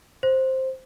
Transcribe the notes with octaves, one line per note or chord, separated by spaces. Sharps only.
C5